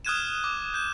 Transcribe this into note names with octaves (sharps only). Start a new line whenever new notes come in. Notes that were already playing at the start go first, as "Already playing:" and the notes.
D#6 F6 F#6 G#6 D#7 E7
D6
G6 E7